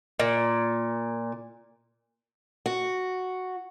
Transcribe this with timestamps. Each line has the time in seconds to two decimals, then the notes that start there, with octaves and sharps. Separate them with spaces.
0.19 A#2
2.66 F#4